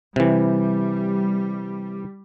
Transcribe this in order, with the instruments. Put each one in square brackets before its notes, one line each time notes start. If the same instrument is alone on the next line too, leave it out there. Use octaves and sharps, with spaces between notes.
[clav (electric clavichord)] C3 E3 [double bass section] G3